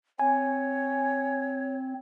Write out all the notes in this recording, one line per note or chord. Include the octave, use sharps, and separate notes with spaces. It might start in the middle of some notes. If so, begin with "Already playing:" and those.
C4 C#5 G#5